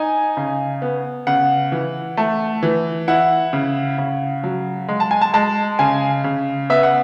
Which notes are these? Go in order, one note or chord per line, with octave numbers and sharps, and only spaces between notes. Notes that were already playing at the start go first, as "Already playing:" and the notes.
Already playing: D#4 G#5
C#3
B3
C#3 F#5
E3
A3
E3
E4 F#5
C#3
C#3
F#3
G#3
A5
G#5
A5
G#3 A5
C#3 G#5
C#3
B3 E5
F#5